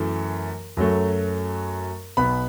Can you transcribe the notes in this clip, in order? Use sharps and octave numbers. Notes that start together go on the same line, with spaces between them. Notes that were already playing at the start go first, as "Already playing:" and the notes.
Already playing: F#2 E3 A3
F#2 F#3 A3
B1 B2 B3 B5